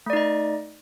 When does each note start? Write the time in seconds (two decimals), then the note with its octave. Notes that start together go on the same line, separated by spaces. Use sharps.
0.06 A3
0.10 D5
0.13 D#4
0.17 D#5